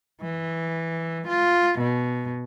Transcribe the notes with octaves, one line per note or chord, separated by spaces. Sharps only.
E3
F4
B2